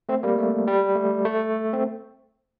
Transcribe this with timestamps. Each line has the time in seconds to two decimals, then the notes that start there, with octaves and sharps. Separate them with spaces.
0.09 A3 C4
0.23 G3 A#3
0.38 A3
0.67 G3
0.95 A3
1.25 A3
1.73 C4